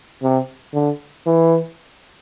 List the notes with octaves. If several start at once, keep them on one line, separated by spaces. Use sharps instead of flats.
C3
D3
E3